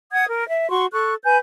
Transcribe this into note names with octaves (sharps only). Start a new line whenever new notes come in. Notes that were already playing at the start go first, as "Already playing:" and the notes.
F#5 D#6 G#6
A#4
E5
F#4 C6 C#6
A4 C#6 F#6
B4 G#5 G6